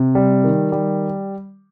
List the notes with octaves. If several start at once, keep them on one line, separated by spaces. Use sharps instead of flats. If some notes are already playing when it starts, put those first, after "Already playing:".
Already playing: C3
G3
D#3
G3